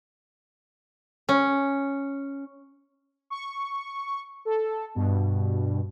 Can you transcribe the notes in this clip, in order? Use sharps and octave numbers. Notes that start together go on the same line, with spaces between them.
C#4
C#6
A4
G2 B2